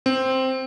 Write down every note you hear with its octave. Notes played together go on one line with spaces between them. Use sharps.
C4